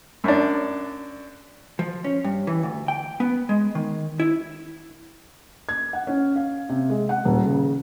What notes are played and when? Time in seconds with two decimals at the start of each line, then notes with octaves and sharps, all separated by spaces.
0.24 F#2 D4
1.79 F3
2.04 C#4
2.24 G2
2.47 E3
2.63 D2
2.88 G5
3.20 B3
3.49 G#3
3.75 D#3
4.20 E4
5.69 G#6
5.93 F#5
6.07 C#4
6.36 F5
6.69 C3
6.90 G#3
7.09 F#5
7.25 D#1
7.45 C#3